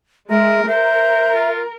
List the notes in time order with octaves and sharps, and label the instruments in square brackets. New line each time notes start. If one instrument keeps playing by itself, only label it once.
[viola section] G#3 [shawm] A#4 [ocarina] E5
[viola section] A#4 [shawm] C5 [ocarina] E5
[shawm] F4